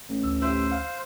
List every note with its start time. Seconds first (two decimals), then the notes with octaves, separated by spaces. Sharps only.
0.09 A1
0.23 D2 E6
0.42 E4 G4 C5 E5
0.71 F5